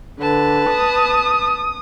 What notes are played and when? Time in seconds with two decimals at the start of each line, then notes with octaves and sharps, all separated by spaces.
0.20 D3 B4 A5
0.70 D#6